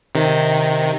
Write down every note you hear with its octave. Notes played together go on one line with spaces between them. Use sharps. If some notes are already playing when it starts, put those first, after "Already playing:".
C3 D#3